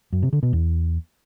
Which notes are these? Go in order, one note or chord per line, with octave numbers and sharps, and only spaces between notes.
F#2
C3
D3
B2
E2